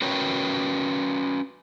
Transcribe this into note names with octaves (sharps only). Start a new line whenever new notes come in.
C#4 F#4 A#4 B4 C#5 G5